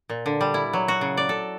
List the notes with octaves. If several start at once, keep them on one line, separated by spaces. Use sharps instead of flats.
A#2
D3
G3
E4
F#3
F#4
C#3
D5
A4